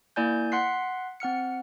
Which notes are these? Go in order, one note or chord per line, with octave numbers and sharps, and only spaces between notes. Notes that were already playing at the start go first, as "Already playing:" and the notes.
A#3 E4 D5 G#5 G6
F#5 C6 F#6 B6 C7
C4 F#5 F6 C#7